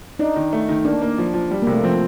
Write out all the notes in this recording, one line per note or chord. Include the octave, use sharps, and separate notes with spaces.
D4 D#4
D#3
A3
D#3
A#3 D4
A#3
F3
F3
G3
C3 A#3
A3
F3 C4